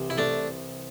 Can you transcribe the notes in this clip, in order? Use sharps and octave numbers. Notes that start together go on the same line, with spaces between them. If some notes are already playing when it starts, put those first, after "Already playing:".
Already playing: C2 C3 E3
E4
A3 D4